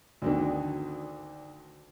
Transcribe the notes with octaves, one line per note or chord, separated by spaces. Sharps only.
D2 D3 D#3